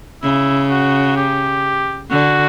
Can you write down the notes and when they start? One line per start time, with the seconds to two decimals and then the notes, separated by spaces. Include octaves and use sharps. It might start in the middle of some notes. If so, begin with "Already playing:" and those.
0.23 C#3 E4
0.70 F#4
1.17 G4
2.11 D3 F#4